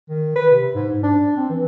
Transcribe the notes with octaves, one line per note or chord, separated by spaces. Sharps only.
D#3
B4
C3
G#2
G#2
D4
C4
E3